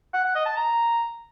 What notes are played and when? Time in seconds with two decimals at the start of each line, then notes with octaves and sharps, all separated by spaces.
0.14 F#5
0.24 F#5
0.35 D#5
0.46 A5
0.56 A#5